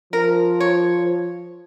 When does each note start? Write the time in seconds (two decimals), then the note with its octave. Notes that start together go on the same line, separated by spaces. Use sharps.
0.13 F3 A#4
0.61 C#5